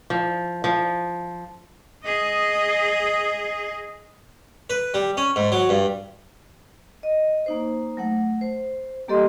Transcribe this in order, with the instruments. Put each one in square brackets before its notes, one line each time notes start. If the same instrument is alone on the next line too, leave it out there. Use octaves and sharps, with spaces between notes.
[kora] F3
F3
[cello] G#4 D#5
[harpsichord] B4
G3
C#4
G#2
F#3
G2
[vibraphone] D#5
A#3 D#4 C5
F#3 A3 F#5
C5
G3 A#3 G4 A4 D#5 C6